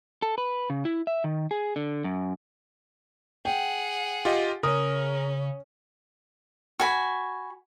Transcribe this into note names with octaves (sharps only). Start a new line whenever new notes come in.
A4
B4
C#3
E4
E5
D#3
G#4
D3
F#2
G#4 F#5 G5
F4 G4 D#5
C#3 C#4 A#4 D#6
F#4 G#5 B5